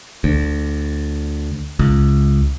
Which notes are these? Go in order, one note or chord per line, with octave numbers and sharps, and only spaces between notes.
D2
C#2